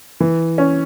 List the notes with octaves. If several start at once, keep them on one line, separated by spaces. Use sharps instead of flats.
E3
C#4